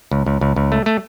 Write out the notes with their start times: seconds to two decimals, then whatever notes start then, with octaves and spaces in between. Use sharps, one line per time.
0.11 C#2
0.26 C#2
0.41 C#2
0.56 C#2
0.72 A3
0.86 A3